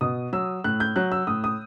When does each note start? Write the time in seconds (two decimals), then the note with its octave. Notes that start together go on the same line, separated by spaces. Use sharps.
0.01 B2 D#6
0.33 F#3 E6
0.64 A2 F#6
0.80 G6
0.96 F#3 F#6
1.12 E6
1.27 A2 D#6
1.44 D#6